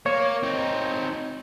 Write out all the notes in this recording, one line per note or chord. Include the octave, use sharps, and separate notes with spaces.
A#3 C#5
C4 D#4